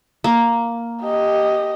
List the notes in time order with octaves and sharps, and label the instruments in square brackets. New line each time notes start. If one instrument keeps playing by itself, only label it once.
[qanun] A#3
[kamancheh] G4 D#5